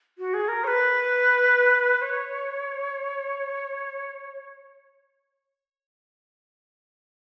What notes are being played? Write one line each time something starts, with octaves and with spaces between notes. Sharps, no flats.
F#4
G#4
A#4
C#5
B4
C#5